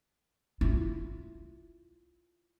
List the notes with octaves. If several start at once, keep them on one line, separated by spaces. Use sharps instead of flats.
E4 F4